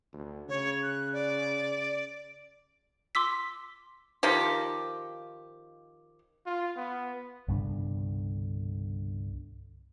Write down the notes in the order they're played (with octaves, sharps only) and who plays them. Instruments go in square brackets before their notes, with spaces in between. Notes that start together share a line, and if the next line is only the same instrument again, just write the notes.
[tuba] D2
[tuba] C#3 [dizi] C#5
[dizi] F#6
D5
[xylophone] C6 D6 E6 B6
[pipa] D#3 F3 G4
[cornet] F4
B3
[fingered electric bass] C2 G2 B2 D3